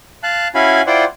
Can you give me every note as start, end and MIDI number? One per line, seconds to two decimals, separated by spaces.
0.23 0.48 77
0.23 0.48 81
0.23 0.48 90
0.55 0.82 61
0.55 0.82 64
0.55 0.82 66
0.55 0.82 77
0.55 0.82 80
0.55 0.82 83
0.87 1.05 64
0.87 1.05 65
0.87 1.05 72
0.87 1.05 74
0.87 1.05 78
0.87 1.05 79